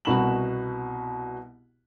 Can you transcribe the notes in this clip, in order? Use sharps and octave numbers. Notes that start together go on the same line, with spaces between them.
C2 B2 F#4 B5 E7 F#7